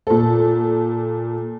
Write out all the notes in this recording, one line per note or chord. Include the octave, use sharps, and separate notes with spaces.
A#2 A4